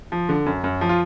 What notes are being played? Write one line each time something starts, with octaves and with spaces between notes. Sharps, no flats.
F3
D3
F#2
F#2
F3
F4